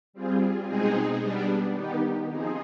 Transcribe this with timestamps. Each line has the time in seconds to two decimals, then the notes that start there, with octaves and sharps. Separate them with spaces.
0.13 G3 C4 F4 G#4
0.68 B2 G#3 C4 D#4 G#4
1.21 G3 B3 D4
1.75 D#3 B3 D#4 G4
2.29 F3 C4 D#4 G#4